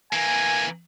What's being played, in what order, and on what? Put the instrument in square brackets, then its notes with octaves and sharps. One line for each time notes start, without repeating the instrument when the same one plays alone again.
[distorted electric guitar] E3 A#3 [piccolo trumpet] G#5